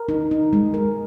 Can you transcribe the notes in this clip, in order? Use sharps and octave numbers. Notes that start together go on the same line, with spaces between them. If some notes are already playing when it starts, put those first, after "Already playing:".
Already playing: A#4
D#4
D#4
G#3
A#4